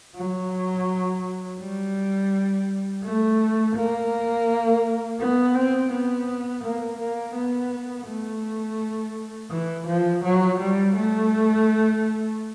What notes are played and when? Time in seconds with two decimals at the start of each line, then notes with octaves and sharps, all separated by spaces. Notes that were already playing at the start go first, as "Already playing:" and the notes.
0.15 F#3
1.60 G3
3.03 A3
3.75 A#3
5.20 B3
5.55 C4
5.91 B3
6.63 A#3
6.99 A#3
7.35 B3
8.06 A3
9.50 E3
9.86 F3
10.23 F#3
10.59 G3
10.96 A3